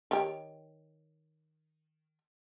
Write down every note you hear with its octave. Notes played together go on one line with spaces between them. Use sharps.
D#3 G4 C#5